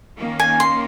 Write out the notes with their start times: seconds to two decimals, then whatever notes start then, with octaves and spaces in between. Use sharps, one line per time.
0.19 D#3 A#3 C#4
0.40 G#5
0.60 C6